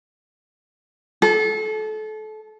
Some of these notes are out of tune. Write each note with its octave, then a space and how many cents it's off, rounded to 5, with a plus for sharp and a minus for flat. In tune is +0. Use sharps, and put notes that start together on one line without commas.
A4 -30